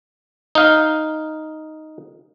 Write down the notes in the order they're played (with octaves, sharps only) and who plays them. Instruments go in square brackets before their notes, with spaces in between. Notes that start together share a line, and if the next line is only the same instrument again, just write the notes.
[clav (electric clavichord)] D#4 F5